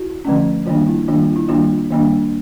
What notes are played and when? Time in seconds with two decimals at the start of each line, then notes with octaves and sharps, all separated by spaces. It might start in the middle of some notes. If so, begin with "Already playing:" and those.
Already playing: E4 F#4
0.25 D3 F3 A3 C#4
0.66 D#3 G3 A#3 D4 F4
0.87 E4
1.08 D#3 G3 A#3 D4 F4
1.22 F4
1.36 E4
1.49 D#3 G3 A#3 D4 F4
1.91 D#3 G3 A#3 D4